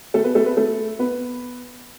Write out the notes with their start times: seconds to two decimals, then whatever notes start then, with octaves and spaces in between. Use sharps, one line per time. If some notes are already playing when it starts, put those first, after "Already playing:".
0.14 A3 A4
0.24 B3 B4
0.35 A3 A4
0.46 B3 B4
0.57 A3 A4
0.99 B3 B4